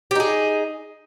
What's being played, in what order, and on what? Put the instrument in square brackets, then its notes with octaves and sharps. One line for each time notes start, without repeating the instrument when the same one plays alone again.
[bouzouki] G4
D#4
G#4